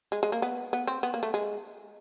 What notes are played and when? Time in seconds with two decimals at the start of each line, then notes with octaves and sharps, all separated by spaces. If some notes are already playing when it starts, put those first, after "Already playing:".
0.12 G#3
0.23 G#3
0.32 A#3
0.42 B3
0.73 B3
0.87 C4
1.03 B3
1.14 A#3
1.23 A3
1.34 G#3